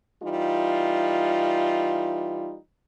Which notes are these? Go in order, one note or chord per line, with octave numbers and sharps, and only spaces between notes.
E3 G3 D#4 F4